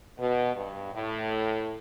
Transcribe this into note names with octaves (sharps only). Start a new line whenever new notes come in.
B2
G2
A2